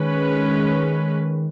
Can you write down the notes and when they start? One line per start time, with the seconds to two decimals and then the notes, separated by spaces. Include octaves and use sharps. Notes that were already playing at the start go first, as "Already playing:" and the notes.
Already playing: D#3 G#3 C#4 B4